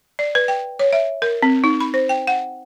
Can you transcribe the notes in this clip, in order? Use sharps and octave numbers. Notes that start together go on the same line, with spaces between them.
D5
B4
G5
C#5
E5
A#4
C4
D#4
B5
C5
G5
F#5